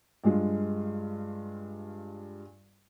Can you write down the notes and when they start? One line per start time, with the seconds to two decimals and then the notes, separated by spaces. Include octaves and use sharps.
0.24 G2 G#3 F4